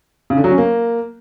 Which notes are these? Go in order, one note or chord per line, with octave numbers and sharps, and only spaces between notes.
C#3
D3
F#3
C#4
A#3